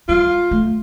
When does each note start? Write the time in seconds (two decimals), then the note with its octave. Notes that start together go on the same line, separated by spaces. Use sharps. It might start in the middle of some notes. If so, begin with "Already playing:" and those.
0.08 G3 F4
0.51 A3